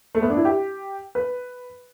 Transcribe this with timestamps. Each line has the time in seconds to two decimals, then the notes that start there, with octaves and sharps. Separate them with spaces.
0.15 A3
0.22 B3
0.30 D4
0.37 E4
0.45 G4
1.15 B4